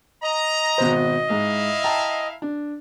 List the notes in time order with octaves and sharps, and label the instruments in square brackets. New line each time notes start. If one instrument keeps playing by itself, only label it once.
[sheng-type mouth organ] D#5 [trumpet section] A#5
[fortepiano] G#1 B2 C5
[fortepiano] G#2 [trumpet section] E4 E5 F5
[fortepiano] G5 A5 A#5
D4